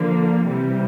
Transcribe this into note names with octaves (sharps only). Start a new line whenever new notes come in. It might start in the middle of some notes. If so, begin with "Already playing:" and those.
Already playing: D3 F3 A#3
C3 E3 G3